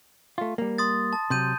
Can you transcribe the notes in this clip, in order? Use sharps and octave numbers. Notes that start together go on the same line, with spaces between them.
A3 F4
G3 A#3
C6 D#6 A6
A5
C3 F#3 C6 G6 D#7